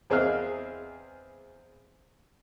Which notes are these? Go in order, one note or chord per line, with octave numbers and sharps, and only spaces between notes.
E2 C4 G#4 D#5 F5 F6